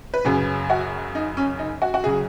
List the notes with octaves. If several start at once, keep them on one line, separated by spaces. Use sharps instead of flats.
B4
F#2 C#3 F#3 G#4
F#4
D#4
C#4
D#4
F#4
F#4
C#3 F#3 G#4